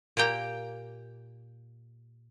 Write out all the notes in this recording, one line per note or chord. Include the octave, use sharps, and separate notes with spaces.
A#2 A#3 G4 G5 A#5